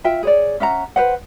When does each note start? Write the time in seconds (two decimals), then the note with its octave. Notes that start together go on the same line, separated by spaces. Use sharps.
0.04 F4 E5 G5
0.23 G#4 C#5 D5
0.60 C#4 E5 F#5 A#5
0.96 B4 C5 F#5